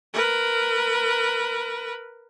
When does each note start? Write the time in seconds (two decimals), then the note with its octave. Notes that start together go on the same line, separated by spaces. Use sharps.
0.14 A#4 B4